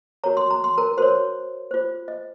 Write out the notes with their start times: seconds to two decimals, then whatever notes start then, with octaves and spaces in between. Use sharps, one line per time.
0.24 F#4 A#4 C#5 A#5
0.37 C6
0.51 A#5
0.64 C6
0.78 A#4 A#5
0.98 F#4 A#4 C5 C#5 C6
1.71 F4 C5
2.08 D#5